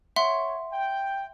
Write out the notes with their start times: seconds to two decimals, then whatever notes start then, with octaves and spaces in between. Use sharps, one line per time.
0.16 C#5 E5 F#5 C6
0.72 G5